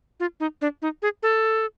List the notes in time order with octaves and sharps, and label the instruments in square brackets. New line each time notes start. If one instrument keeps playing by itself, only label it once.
[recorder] F4
D#4
D4
D#4
G#4
A4